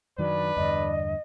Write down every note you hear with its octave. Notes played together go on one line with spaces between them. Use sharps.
F#2 D#3 F#3 D4 B4 D5
E2 G2 D3 D#5